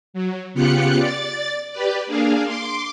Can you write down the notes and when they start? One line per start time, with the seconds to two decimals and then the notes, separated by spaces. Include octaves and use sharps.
0.14 F#3
0.54 C#3 B3 F4 G4 F#6 C#7
0.99 D5 A6
1.72 G4 B4 D5
2.07 A#3 D4 G#4 F5
2.45 C6 D6